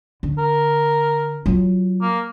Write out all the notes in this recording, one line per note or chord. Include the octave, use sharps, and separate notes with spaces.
D3
A#4
F#3 F4
A#3